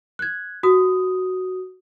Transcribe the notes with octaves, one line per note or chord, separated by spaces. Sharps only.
F#6 G#6
F#4 D#6